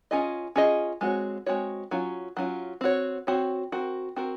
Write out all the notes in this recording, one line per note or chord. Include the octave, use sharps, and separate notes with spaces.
C#4 F4 G#4 D#5
C#4 F4 G#4 D#5
G#3 C4 F#4 C#5
G#3 C4 F#4 C#5
F#3 C#4 F4
F#3 C#4 F4
C4 F#4 C#5
C4 F#4 C#5
C4 F#4 A#4
C4 F#4 A#4